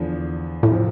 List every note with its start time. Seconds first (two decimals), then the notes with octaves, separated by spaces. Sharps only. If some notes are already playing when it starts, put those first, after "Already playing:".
Already playing: E2 D3 F3
0.63 A2
0.70 C3 F3 C4